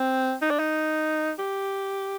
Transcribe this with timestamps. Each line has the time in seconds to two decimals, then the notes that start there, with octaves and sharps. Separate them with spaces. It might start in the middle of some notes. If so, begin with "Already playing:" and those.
Already playing: C4
0.42 D#4
0.51 D4
0.59 D#4
1.39 G4